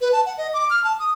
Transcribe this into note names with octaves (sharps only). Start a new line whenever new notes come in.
B4
A5
F#5
D#5
D6
F6
A5
D#6